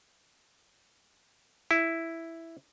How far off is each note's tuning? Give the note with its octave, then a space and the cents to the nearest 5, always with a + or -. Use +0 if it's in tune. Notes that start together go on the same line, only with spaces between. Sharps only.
E4 +0